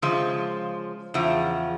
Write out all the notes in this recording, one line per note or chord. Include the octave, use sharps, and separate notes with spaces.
C#3 F3 G#3
E2 C#3 F3